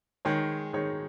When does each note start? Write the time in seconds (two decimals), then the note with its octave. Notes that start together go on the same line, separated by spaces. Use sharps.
0.25 D#3 G#3 D#4 G#4 C#5
0.73 D#3 G#3 D#4 G#4 C#5